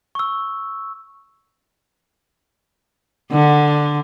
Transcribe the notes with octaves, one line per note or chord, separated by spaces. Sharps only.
C#6 E6
D3